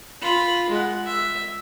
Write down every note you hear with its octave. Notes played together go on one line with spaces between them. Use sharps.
F4 B5
G#3 F#5
E5